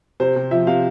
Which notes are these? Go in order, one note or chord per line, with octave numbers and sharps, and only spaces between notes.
C3 C5
C3
F3 E5
C3 F5